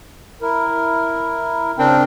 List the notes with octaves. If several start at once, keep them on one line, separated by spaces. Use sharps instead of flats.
E4 A#4
C#3 C4 D4 A#4 G5